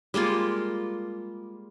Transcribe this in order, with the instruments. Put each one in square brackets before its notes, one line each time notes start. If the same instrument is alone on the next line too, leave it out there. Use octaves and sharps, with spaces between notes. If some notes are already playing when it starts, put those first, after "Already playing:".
[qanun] G3 G#3 A#3 F4